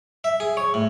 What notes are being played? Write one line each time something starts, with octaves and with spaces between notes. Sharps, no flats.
E5
G#4
C#5
A2